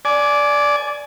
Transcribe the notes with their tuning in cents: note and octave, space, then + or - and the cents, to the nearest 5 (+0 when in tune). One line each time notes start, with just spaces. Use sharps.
D5 -10 G#5 +20